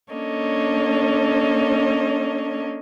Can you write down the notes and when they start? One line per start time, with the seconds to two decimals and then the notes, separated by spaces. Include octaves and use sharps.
0.12 A#3 C#4 D4 A4 C#5 D#5